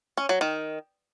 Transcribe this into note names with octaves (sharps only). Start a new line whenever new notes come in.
C#4
F#3
D#3